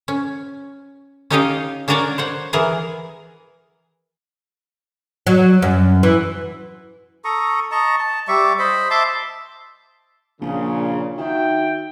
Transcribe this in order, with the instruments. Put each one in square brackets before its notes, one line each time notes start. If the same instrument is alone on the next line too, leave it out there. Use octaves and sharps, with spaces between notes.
[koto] C#4
C#4 D#4 G4 C#5 D#5 F5
C#4 D4 F#4 A#4 C#5 D5
C5 C#5 F#5
E3 G#4 A#4 F#5 G#5
[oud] F#3
F#2
E3
[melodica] A4 A#5 C#6 D#6
D#5 A5 A#5 C#6
A5
G3 D5 E5 C#6
C5 D#5 B5
E5 A5 C6 D6
[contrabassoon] A#1 [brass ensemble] A#2 C#3
[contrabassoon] D#3 [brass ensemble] F#4 E5 G5